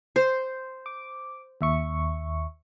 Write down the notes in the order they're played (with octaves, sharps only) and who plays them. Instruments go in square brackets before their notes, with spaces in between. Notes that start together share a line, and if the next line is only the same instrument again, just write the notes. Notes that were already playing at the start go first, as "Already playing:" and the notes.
[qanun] C5
[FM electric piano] D6
D#2 E5 C#6